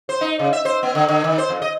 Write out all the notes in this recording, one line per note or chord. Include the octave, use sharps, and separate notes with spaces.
C5
D#4
C#3
E5
C5
B3
D3
D3
D#3
C5
F2
D#5